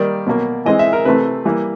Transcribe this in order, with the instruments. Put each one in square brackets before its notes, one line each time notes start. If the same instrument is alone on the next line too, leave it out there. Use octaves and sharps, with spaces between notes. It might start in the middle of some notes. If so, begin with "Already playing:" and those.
Already playing: [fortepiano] D#3 G3 A#3 D5
B2 F#3 A#3
E3 G#3 C4 D#5
E5
A#4
C3 E3 A3 C4 B4
E3 G3 A#3